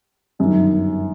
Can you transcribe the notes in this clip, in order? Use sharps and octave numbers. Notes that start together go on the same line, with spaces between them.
G1 F#2 D#3